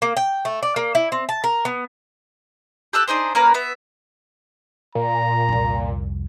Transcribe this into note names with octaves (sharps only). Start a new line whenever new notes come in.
A#3
G5
A3
D5
A#3
E4
C4
A5
A#4
B3
G4 A4 E6 F#6
D4 D#4 G#4 C5
A#3 C#4 A#4 B4
B3 E5
A#2 A#5
C2 F2